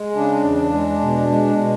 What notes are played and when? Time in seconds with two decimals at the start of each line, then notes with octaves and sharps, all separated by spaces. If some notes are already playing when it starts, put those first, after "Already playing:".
Already playing: G#3
0.15 C#3 D4
0.44 E2
0.73 G#3
1.01 B2
1.29 G#3
1.58 B2